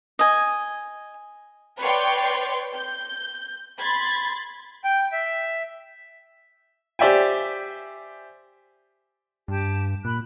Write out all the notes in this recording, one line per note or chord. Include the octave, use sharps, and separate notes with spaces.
D#5 G#5
B4 C#5 D5 G5 C6
G6
B5 C6 G#6 A6
G5
E5
G4 C5 D5 E5 G5 G#5
G2 G4 A5
A#2 B5 F#6